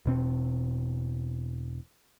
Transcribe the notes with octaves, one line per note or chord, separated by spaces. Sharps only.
E1 B2 C4